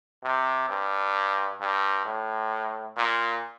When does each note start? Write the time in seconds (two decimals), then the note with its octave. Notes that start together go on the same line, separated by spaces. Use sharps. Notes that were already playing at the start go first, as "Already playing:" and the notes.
0.24 C3
0.69 G2
1.60 G2
2.05 A2
2.97 A#2